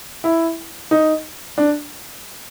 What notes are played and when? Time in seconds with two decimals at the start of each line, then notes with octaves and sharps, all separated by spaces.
0.24 E4
0.91 D#4
1.58 D4